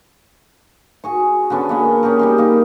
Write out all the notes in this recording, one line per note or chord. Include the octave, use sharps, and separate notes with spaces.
F#4 G#4 C#6
D3 B3 C#4 D4
G#3 A#3 B3
C#4 G4 G#4 A#4
G3 D#4 C6
A#3 D#4